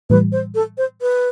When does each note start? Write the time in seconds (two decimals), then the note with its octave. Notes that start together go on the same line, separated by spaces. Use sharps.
0.10 A2 E3 G3 B4
0.32 C5
0.55 A4
0.78 C5
1.02 B4